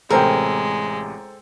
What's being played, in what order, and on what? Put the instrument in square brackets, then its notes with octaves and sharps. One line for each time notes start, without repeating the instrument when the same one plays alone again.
[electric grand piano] A1 C3 [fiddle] G#3 [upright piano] A4 C5 G5 [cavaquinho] A#4